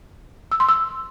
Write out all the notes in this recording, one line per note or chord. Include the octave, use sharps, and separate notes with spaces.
E6
C6
E6